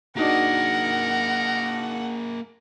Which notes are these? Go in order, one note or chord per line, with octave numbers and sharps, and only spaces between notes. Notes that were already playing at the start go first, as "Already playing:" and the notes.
A#3 D4 D#4 F#4 G#4 A#4 F#5